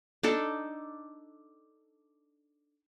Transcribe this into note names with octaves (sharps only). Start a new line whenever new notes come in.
D4 D#4 A4